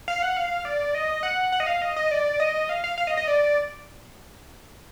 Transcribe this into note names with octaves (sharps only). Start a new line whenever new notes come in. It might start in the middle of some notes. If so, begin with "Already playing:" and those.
F5
F#5
F5
D5
D#5
F#5
F#5
D#5
F5
D#5
D#5
D5
D#5
F5
F5
F5
D#5
D#5
D5